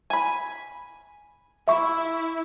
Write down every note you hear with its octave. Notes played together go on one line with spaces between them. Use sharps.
G#5 B5
E4 E5 C#6